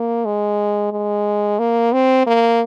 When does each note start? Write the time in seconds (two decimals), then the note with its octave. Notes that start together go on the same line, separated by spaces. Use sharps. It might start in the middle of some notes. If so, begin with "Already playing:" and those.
Already playing: A#3
0.25 G#3
0.92 G#3
1.59 A#3
1.93 C4
2.27 A#3